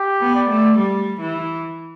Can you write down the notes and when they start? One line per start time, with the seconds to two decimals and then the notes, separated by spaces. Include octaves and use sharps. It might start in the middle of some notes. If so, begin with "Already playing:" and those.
Already playing: G4
0.21 B3
0.35 D5
0.49 A3
0.77 G3
1.20 E3